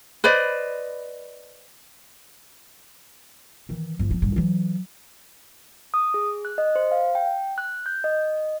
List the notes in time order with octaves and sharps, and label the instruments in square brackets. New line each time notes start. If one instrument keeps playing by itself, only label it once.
[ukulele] B4 C5 D5 D#5
[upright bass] D#3 E3
G1 E3
F3 C4
A1 G2
E3 F#3
[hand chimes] D#6
G#4
F#6
D#5
C5
F5
G5
F#6
G6
D#5